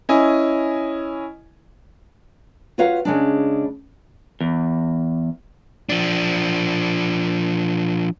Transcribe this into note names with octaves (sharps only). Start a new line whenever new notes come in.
C#4 E4 D#5 G#5
F4 F#4 B4 C#5 F5 F#5
C#3 G#3 D4
E2
F3 D4